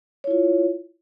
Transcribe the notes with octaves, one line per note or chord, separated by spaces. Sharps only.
E4 F4 C#5